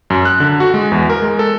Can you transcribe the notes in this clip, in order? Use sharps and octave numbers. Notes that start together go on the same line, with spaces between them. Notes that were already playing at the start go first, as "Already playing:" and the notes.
F#2
F#6
D3
F#4
G#3
E2
A#4
G#3
A4